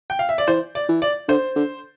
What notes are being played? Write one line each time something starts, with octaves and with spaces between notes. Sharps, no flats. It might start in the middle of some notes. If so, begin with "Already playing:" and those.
G5
F5
E5
D5
E3 C5
D5
E3
D5
D3 C5
D3